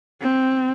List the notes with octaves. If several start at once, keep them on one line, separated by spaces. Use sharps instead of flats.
C4